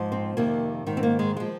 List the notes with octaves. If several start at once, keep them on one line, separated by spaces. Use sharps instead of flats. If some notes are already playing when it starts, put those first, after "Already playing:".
Already playing: G#2 F3
C4
F2 C3 D#3 A#3
G#2 D#3
C4
A#3
G#3
F3 G#3